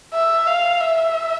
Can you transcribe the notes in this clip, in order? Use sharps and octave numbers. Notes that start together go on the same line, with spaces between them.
E5
F5
E5